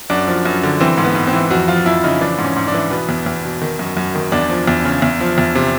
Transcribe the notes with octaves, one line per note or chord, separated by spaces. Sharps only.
F#2 D4
F3
F#2
D3
E3 C4
G#2
B3
G#2
C4
E3
F2 F#4
F3 F4
F2 E4
C#3 D#4
E3 D4
G#2
C#4
G#2
D4
E3
B2 B3
E2
E2
B2
D#3
F#2
F#2
D#3
E2 D4
F3
E2
C#3
E2
F3
E2
C3